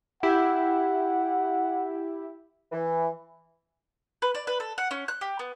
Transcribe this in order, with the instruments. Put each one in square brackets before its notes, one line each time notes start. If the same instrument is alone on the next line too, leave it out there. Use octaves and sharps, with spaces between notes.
[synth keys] E4 G4 [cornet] F#5
[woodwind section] E3
[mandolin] B4
D5
B4
A4
F#5
C#4
F#6
G4
B3